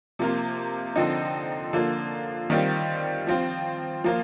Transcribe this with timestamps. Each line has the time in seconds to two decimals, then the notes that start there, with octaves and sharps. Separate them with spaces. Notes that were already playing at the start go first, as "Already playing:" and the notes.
0.19 C3 F3 A#3 F4
0.96 D3 F3 C4 D#4
1.73 D3 F3 A#3 F4
2.50 D#3 G3 C4 F4
3.27 F3 C4 F4
4.04 F3 A#3 F4